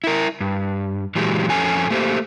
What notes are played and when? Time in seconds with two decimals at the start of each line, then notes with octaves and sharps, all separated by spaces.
0.04 E4 A#4
0.41 G2
1.16 A#2 E3 F#3 G#3 G4
1.50 F2 C#4 A4 G#5
1.90 A3 A#3 G4 C5